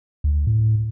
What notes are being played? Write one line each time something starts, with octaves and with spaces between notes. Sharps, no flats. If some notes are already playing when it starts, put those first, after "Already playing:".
D2
A2